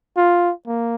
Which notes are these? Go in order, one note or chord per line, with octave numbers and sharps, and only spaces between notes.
F4
A#3